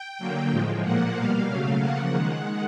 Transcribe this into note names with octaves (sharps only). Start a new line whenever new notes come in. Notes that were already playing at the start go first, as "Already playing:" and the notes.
Already playing: G5
D3 F#3 A#3
A2 F3 G#3
A#2 F3 A#3 F#5
B2 G3 A#3 F5
C#3 F#3 A3
C#3 F3 A#3 F#5
D#3 G#3